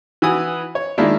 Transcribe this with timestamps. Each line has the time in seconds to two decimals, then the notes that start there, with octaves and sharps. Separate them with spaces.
0.22 E3 F#4 B4 G#5 D#6
0.75 C#5
0.98 D#3 G#3 A#3 D4 E4 F4